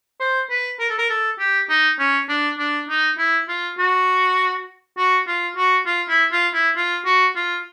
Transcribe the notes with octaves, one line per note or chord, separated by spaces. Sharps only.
C5
B4
A#4
A4
A#4
A4
G4
D#4
C#4
D4
D4
D#4
E4
F4
F#4
F#4
F4
F#4
F4
E4
F4
E4
F4
F#4
F4